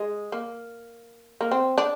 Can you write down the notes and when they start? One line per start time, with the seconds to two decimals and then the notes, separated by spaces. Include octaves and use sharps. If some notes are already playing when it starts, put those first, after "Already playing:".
Already playing: G#3
0.32 A#3
1.41 A#3
1.51 C4
1.78 D4